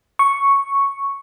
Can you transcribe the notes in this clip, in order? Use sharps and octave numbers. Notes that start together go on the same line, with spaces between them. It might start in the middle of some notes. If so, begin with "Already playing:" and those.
C#6